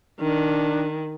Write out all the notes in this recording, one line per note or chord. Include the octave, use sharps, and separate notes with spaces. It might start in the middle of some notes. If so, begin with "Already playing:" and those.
D#3 D4